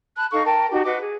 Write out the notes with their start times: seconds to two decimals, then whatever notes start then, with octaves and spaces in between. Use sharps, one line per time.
0.17 A5 B5 F#6
0.32 D#4 A4 F5 C#6
0.46 A#4 G5 A5
0.70 D#4 F#4 G4
0.84 F#4 B4 D#5 D6
1.00 G#4